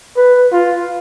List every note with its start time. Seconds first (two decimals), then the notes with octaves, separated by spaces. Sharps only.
0.17 B4
0.53 F4